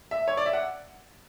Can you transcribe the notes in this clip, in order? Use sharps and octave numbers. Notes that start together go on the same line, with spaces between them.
E5
C#5
D5
E5
F#5